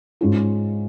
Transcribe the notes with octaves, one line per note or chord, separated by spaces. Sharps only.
G#2 G#3 C#4 F4